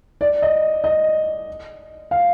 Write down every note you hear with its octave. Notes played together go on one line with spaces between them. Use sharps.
D5
D#5
D#5
F5